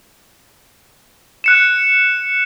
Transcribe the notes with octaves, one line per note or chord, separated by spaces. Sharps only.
F#6 C#7 E7